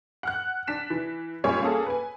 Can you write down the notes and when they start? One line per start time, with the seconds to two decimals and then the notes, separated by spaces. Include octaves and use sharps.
0.23 F#5 F6 F#6
0.67 D4 B6 E7
0.90 E3
1.44 F#2 A#2 G3 C#5 G#5
1.62 A#3 C#4 G#4 A4
1.87 B4 G#5